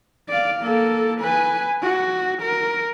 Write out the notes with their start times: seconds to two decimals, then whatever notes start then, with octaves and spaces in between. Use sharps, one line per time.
0.29 D5 F5
0.61 A#3 A4
1.21 B4 G#5
1.82 F#4
2.42 A#4